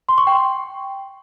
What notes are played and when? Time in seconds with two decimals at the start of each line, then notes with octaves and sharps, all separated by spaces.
0.09 C6
0.18 C#6
0.27 G5